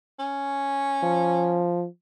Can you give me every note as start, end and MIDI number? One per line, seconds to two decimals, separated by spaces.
0.19 1.67 61
1.03 1.86 53